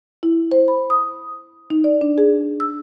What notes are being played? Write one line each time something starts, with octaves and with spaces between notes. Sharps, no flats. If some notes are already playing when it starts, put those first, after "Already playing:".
E4
C5
B5
D#6
D#4
D5
D4
G#4
E6